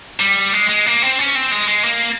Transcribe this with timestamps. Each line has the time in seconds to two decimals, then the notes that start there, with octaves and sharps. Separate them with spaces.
0.20 G3
0.53 G#3
0.69 G#3
0.86 A#3
1.02 C4
1.19 C#4
1.35 C4
1.52 G#3
1.68 G#3
1.84 A#3